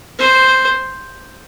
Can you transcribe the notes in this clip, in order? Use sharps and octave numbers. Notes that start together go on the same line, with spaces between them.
C5